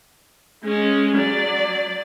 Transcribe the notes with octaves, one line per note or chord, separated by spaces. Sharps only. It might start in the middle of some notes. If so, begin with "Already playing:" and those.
G#3 C#4
F#3 D5